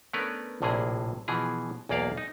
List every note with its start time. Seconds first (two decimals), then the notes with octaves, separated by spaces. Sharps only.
0.13 A3 B3 C#4 D4 A#4 B4
0.62 A#1 A2 C3 A#3 G#4
1.28 B2 E3 F3 G#4
1.89 B1 E2 A#3 D5 F5
2.18 D#4